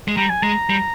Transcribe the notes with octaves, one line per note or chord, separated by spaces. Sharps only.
G#3
G3 A#5
G#5
G#3 A#5
G3